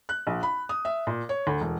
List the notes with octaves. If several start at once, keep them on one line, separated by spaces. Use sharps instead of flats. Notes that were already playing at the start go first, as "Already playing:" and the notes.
F#6
A#1
B5
D#6
E5
A#2
C#5
D2
E1